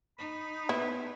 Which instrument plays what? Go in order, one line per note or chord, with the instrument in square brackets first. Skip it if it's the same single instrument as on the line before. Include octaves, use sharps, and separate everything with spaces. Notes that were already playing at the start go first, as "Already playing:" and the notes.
[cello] D#4 [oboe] B5
[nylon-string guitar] B3 [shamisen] E4